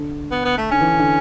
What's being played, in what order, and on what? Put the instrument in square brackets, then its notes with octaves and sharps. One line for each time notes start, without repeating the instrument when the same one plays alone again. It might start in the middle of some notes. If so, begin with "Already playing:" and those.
Already playing: [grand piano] D3
[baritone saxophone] B3
B3
A3
[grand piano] D3 [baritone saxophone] C#4
[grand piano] E3
D3
D3